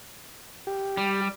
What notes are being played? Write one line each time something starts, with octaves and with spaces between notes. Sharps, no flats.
G4
G3